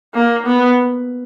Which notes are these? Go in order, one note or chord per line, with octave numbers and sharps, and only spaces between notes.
A#3
B3